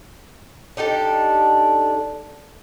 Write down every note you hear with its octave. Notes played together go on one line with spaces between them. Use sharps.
D4 D#4 G4 A4